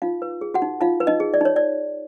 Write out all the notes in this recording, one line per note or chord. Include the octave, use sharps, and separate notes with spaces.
D#4 F4 F5
B4
G#4
F#4 F#5
D#4
D#4 F4 F5
B4
D#4 D#5
G#4
D5
D#4 C#5
D5